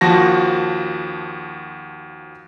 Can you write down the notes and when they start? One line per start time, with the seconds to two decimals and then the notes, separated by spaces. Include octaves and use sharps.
0.01 D#2 F3 F#4 A5 A#6